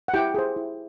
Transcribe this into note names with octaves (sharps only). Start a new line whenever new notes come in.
F#5
E4 G4 G5
G#4 C5
E4